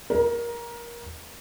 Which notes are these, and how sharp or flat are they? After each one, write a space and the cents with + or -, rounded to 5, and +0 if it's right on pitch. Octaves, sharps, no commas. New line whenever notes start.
A#4 +20